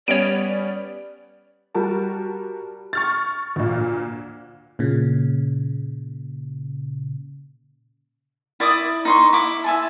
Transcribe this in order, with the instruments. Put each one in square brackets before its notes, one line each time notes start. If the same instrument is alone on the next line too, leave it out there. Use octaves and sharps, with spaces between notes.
[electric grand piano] G3 B3 C#4 [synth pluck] C#5 D7 [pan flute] D5
[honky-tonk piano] G3 F#4 A#4 A5
C#6 F6 A6
D2 A#2
[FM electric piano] A#2 C#3
[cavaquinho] E4 D5 D6 D#6
D#4 C6 C#6
E4 D6
E5 G#5 A5